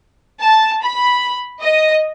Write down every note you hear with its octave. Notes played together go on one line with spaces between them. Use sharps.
A5
B5
D#5